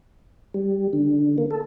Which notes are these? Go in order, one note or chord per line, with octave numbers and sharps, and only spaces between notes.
G3
D3
A#3
A4